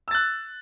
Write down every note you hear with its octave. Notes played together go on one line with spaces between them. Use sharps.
E6 F#6 A6